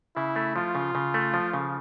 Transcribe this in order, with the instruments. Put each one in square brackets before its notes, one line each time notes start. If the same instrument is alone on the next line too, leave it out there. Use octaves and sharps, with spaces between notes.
[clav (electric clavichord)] C#3 [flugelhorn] E4
[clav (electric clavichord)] A3
[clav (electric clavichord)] F3 [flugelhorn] F4
[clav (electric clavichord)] C#3
C#3
A3
F3
C#3